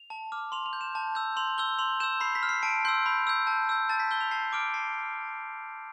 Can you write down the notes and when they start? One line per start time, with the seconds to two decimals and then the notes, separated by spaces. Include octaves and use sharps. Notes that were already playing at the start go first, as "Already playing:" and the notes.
Already playing: F7
0.10 A5
0.32 D6 F6
0.52 C6 F7
0.66 F7
0.73 G6
0.81 E7
0.95 A5
1.15 E6 G6
1.37 C6 F7
1.58 E6 G6 G7
1.79 C6 F7
2.00 E6 G6 E7
2.20 B5 C7
2.35 B6
2.43 F6
2.49 C7
2.63 A5 D7
2.85 C6 E6 G6
3.06 B5
3.27 E6 G6
3.47 A5
3.69 E6 G6
3.89 A5 A6
4.00 B6
4.11 E6 G6 G7
4.21 F7
4.31 A5 C7
4.53 D6 F6 D7
4.74 A5 C7